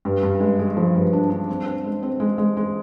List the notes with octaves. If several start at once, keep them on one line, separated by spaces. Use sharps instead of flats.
G2
G2
G#3
G#3
F3
G2
D4
D4
C4
C4
G#3
C4
G#3
G#3
G#3